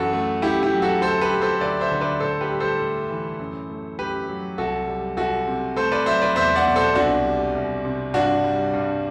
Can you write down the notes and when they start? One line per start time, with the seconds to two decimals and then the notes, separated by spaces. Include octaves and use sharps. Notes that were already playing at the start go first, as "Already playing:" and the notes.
Already playing: F#2 E3 F#4 A4
0.13 A3
0.42 F#2 E4 G4
0.62 E4 G4
0.73 F#3
0.82 F#4 A4
1.02 D2 A4 C5
1.21 G4 B4
1.31 F#3
1.42 A4 C5
1.61 D2 B4 D5
1.81 C5 E5
1.91 D3
2.01 B4 D5
2.20 A2 A4 C5
2.41 G4 B4
2.51 G3
2.60 A4 C5
2.80 A2
3.10 E3
3.39 F#2
3.69 A3
3.99 F#2 G4 B4
4.29 F#3
4.58 C2 F#4 A4
4.87 G3
5.17 C2 F#4 A4
5.48 C3
5.76 A3 A4 C5
5.92 B4 D5
6.06 F#3 C5 E5
6.21 B4 D5
6.36 E2 C5 E5
6.55 D5 F#5
6.65 B2
6.76 A4 C5
6.95 C2 D4 F#4
7.25 G3
7.55 C2
7.85 C3
8.14 G2 D4 F#4
8.44 G3
8.74 G2